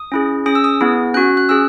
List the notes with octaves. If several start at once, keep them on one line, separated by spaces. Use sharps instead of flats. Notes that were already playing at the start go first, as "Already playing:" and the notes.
Already playing: D#6
C#4 E4 G#4
C#4 G#4 D#6
E6
D#6
B3 E4 G#4
C#4 F#4 F#6
F#6
C#4 G#4 E6